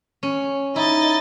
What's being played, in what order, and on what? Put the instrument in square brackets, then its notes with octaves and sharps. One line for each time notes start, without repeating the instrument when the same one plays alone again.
[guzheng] C#4
[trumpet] D#4 [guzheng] E4 [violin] D#5 A6